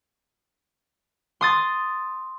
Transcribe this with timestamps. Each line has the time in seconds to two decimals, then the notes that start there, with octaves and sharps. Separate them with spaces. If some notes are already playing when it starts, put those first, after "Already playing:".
1.41 C6 D#6 A6